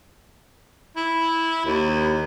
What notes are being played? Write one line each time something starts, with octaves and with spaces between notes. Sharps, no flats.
E4
D#2